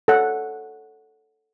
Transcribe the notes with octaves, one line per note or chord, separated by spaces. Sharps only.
A4 C#5 F#5